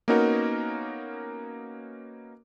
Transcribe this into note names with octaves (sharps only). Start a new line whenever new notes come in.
A#3 B3 C#4 D#4 F#4 A#4